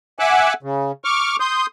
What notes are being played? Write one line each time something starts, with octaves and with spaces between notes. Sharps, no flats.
E5 F#5 G#5 D6 E6 F#6
C#3
C#6 D6 F6
C6 D#6 G6